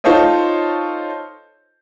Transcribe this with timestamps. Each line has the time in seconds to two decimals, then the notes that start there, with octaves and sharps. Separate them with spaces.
0.04 D#4 F4 A4 C5 C#5 D#5